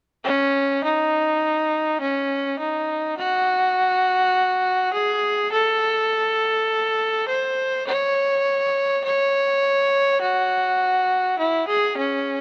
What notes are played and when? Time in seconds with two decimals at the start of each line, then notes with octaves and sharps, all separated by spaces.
0.24 C#4
0.84 D#4
2.01 C#4
2.59 D#4
3.18 F#4
4.93 G#4
5.52 A4
7.28 C5
7.87 C#5
9.05 C#5
10.21 F#4
11.39 E4
11.68 G#4
11.98 C#4